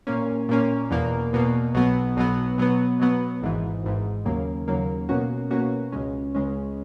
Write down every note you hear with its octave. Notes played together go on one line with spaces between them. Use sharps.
A#2 A#3 C#4
A#2 A#3 C#4
E2 B2 A#3
E2 B2 A#3
B1 B2 F#3 B3
B1 B2 F#3 B3
B2 F#3 B3
B2 F#3 B3
G#1 G#2 E3
G#1 G#2 E3
D#2 C#3 F#3 A#3
D#2 C#3 F#3 A#3
B2 A#3 C#4 F#4
B2 A#3 C#4 F#4
C#2 C#3 G#3 C#4
C#2 C#3 G#3 C#4